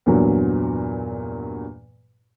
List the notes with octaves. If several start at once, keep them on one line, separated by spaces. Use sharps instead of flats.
E2 G2 A#2 F#3